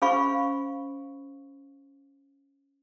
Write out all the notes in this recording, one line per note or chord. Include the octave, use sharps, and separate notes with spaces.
C#4 G#4 C5 F5 B5 C#6